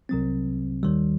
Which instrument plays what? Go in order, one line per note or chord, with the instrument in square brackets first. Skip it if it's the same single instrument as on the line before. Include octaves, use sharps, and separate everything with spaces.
[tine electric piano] C2 C3 F#3 C4
D#2 D#3 G3